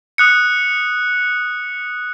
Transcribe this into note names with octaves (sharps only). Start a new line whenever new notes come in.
D#6 F#6 C#7